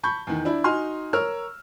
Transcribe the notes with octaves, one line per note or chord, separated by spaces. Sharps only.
A5 B5 C#6 G6
E2 D#3
D4 E4
D#4 F#4 G#5 C6 F6
A#4 C#5 E6 F6